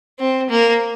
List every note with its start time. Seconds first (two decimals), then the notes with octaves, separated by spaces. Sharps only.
0.19 C4
0.50 A#3